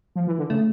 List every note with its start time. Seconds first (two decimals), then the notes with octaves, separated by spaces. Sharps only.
0.16 F3
0.27 E3
0.39 D3
0.50 C#3 A3